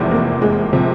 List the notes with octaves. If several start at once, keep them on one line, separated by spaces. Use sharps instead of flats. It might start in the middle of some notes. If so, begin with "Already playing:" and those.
Already playing: F1 E2 C3 F3 G#3
A#3
G#3
C3 F3